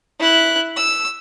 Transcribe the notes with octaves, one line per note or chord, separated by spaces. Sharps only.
E4 F#6
E6